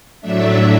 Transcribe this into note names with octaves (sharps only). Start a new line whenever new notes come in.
A2 F#3 A3 D4 E5